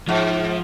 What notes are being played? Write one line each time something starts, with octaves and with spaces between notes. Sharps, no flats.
G#2 F3